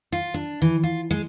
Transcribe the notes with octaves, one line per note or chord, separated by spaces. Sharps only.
F4
D4
E3
F4
G#3